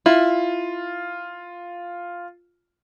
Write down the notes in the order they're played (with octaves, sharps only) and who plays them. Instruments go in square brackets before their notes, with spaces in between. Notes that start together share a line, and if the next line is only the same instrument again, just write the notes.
[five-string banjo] E4 [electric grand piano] F4